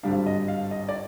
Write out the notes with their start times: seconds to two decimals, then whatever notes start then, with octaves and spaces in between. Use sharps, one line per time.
0.03 G#1 G2 D3 G3 D4 F5
0.26 D#5
0.48 F5
0.71 D#5
0.89 D5